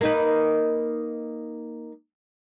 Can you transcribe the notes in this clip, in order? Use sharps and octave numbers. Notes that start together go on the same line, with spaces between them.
A#3 D#4 B4